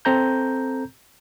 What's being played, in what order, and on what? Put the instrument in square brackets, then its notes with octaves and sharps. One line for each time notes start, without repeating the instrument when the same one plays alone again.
[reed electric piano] C4 A4 A#5 G6